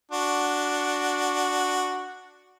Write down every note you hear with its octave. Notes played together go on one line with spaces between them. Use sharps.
D4 F#4